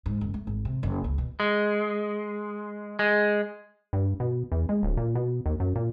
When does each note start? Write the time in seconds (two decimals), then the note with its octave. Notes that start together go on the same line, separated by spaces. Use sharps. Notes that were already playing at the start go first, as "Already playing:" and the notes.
0.06 G#2
0.21 F#1
0.34 A3
0.47 G#1
0.65 C3
0.83 F#1
1.04 C#2
1.18 B2
1.40 G#3
2.99 G#3
3.93 G2
4.20 B2
4.52 E2
4.69 G#3
4.83 D1
4.97 A#2
5.15 B2
5.46 D#2
5.60 F#2
5.76 A#2